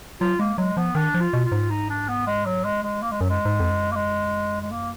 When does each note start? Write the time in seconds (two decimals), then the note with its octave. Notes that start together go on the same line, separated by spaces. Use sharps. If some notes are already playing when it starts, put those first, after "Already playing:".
0.21 F#3 F4
0.39 G#3 A#3
0.58 F#3 G#3
0.77 F3 B3
0.95 D#3 D4
1.14 F3
1.20 F4
1.33 B2
1.45 F4
1.52 G#2
1.70 D#4
1.90 D4
2.08 B3
2.27 G#3
2.46 F#3
2.64 G#3
2.83 G#3
3.02 A#3
3.11 G#3
3.21 F#2 F#3
3.29 G#3
3.45 G#2
3.60 F2
3.70 F#2
3.91 A#3
3.95 G#3
4.61 G#3
4.71 A#3